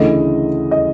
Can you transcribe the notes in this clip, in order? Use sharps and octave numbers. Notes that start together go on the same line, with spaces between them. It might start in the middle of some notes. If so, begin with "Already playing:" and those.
Already playing: D2 C#3 E3 A3 D#5
D#5